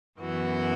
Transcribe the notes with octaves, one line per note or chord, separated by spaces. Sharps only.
F#2 E3 B3 F#4